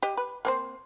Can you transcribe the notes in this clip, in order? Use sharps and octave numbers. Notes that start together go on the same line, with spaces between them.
G4 D#5
B4
A#3 C4 C5